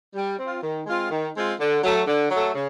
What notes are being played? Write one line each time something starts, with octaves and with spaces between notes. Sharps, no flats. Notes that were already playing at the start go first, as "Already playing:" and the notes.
G3
C4
F4
D#3
G#3 C4 F4
D#3
G#3 C4 F4
D3
F#3 A3
D3
F#3 A3
C#3